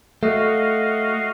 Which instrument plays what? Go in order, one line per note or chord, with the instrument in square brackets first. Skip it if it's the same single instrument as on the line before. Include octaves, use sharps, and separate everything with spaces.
[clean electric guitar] A3 [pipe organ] F#4 D#5 F5